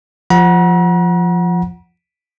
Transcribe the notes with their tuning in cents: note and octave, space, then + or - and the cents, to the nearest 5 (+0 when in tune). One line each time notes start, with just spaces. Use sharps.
F3 +0 F#5 +0 A#5 +45